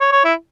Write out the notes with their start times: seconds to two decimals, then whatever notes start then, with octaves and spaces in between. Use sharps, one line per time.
0.01 C#5
0.12 C#5
0.25 E4